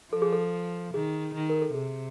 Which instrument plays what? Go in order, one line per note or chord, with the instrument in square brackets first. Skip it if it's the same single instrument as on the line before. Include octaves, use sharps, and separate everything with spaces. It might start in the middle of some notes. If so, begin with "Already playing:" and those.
[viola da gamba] F3 [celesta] A4
[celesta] G#4
A4
[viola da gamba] D#3 [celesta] G#4
[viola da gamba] D#3
[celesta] A#4
A4
[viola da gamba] C3 [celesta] G#4